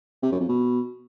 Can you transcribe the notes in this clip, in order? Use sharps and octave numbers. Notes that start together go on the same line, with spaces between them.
C3
F#2
F2
B2